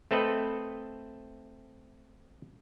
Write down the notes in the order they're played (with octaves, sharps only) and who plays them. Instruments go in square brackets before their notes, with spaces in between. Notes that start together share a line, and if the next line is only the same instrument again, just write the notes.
[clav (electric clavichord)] A3 C4 A4 B4 D#5